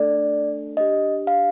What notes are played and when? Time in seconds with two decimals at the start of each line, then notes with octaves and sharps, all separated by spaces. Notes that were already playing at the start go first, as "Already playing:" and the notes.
Already playing: A3 D4 A4 D5
0.77 D4 G4 D#5
1.27 F5